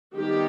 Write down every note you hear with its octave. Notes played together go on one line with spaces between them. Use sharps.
D#3 G3 B3 G4